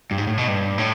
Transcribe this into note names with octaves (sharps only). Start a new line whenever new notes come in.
G2
G#2
A2
B2
G2
A2